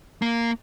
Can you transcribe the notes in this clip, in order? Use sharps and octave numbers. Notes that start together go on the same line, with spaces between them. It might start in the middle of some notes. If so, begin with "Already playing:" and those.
A#3